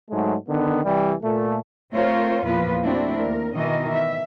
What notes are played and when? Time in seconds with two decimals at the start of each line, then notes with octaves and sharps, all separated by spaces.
0.10 G#2 F#3 G#3 A3
0.49 D3 D#3 B3
0.84 C2 E3 G3
1.23 A#2 A3
1.93 A3 C4 F4 A#4 C5 C#5
2.45 E2 A#2 F3 A#3 F4 B4
2.83 A3 C4 D4 E4 F#4
3.16 D#2 A#4
3.55 B2 D#3 E3 A#4 D#5
3.90 E5